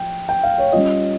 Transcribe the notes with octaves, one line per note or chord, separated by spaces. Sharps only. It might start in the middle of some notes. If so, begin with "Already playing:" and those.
Already playing: F3 G5
G5
F5
C#5
G3 C#4 F4 D#5